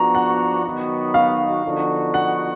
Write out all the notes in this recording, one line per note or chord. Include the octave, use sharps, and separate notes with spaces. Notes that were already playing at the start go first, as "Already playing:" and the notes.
Already playing: F3 B3 D4 F#4 A#5
F#5
D#3 F#3 B3 D#4 F#4
F5
D3 F3 B3 D#4 F#4
F#5